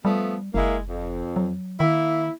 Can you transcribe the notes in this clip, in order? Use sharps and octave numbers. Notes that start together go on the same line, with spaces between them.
F3 G3 A3 B3
F#1 G#3 A#3 E4
F2
F#3
D#3 A#3 E4